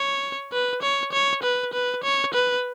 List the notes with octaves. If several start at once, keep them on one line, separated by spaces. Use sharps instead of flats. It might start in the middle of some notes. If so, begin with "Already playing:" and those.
Already playing: C#5
B4
C#5
C#5
B4
B4
C#5
B4